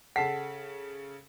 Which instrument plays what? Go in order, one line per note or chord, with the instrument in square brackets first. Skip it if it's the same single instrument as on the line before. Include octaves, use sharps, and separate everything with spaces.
[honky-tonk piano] C#3 A4 B6 [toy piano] F#5